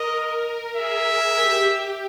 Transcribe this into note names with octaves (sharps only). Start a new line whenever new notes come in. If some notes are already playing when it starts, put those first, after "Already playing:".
Already playing: A#4 D#5
G#4 E5
G4
G4